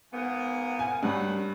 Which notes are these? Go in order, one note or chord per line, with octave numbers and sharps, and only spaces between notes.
G#2 A#3 B3
G#5
G2 D#3 F#3 F#5